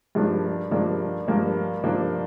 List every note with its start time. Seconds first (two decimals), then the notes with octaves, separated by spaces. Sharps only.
0.15 G2 F3 A#3 D4
0.71 G2 F3 A#3 D4
1.28 G2 F3 A#3 D4
1.84 G2 F3 A#3 D4